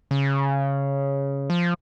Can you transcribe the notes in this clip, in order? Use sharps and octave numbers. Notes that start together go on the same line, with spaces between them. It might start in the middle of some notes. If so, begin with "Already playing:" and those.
C#3
F3